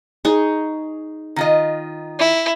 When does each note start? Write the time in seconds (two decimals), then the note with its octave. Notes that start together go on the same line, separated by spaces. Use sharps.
0.25 D#4 G#4 C#6
1.36 D#3 F4 D#5
2.19 E4